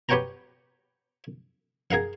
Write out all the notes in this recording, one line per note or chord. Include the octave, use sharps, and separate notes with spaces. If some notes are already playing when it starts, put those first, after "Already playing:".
G4 B4 C#5 F#5 G5 A#5
G#4 A#4 F5 F#5